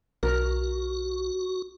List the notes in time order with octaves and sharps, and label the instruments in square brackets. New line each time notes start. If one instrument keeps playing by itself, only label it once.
[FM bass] B1 [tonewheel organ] F#4 [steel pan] A#4